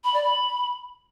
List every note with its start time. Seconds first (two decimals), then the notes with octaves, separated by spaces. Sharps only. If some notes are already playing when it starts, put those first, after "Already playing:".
0.04 B5
0.14 D5
0.24 B5